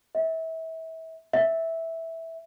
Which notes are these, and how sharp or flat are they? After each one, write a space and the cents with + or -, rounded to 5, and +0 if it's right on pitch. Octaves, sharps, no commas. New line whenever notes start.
E5 -30
E5 -10